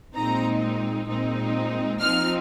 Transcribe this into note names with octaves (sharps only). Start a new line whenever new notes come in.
A#2 G#3 C4 D#4 A#5
A#2 G#3 C4 D#4
F3 C4 D#4 F6